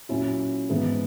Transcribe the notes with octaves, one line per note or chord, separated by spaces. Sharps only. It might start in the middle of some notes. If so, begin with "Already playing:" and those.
A#2 F#3 C#4 E4
G#2 E3 B3